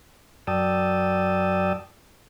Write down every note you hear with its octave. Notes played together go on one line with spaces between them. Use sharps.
F#2 D5 G5 A5 D#6 E6